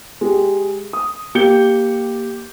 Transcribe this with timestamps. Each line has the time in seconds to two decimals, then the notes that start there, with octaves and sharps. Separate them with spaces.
0.21 G#3 G4
0.93 D#6
1.35 A#3 G4 G6 C#7 G7